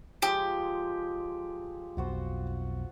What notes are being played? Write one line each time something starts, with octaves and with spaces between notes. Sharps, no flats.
F3 G#3 G4 G#5
B1 F2 F4 F#4 C5